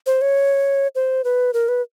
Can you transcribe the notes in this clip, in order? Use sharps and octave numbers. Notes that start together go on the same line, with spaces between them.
C5
C#5
C5
B4
A#4
B4